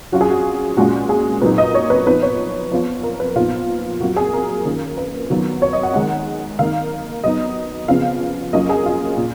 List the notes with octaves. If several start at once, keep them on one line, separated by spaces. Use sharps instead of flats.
F#3 C#4 F4 F#4
G#4
F#4
A#2 G#3 C#4 F4 F#4
G#4
A#2 F#3 A#3 D#4 B4
D#5
C#5
B4
F3 B3 D#4 B4
C#5
F3 B3 F4
A#4
B4
A#2 F3 B3 D#4 F4
F#3 A#3 F4 F#4
G#4
A#4
D#3 A#3 C#4 F4
B4
D#3 F#3 B3 F4
C#5
D#5
F#5
D#3 G#3 D#4 F#5
D#3 A#3 D#4 F5
F#3 B3 D#4 D#5
C#3 F3 B3 F4 F5
F#3 A#3 C#4 F4 D#5
G#4
F4
A#2